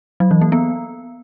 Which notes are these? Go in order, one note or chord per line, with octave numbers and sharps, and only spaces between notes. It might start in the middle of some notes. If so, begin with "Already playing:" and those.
F#3
E3
A#3
B3